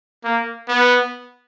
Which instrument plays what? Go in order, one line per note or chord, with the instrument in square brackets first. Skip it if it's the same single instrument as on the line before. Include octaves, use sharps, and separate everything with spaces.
[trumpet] A#3
B3